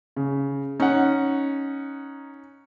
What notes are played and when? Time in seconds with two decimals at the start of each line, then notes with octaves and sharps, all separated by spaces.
0.16 C#3
0.80 C#4 D#4 F#5